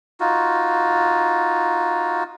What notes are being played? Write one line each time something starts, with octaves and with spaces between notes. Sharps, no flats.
D#4 F4 F#4